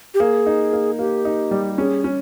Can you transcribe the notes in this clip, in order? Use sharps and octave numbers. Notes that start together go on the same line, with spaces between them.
G4
A#3 G#4
D#4
A#3
A#3 G4
D#4
G3
C#4 G#4
C#4